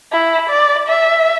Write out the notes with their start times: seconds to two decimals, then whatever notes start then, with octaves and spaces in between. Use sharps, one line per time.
0.12 E4
0.50 D5
0.88 E5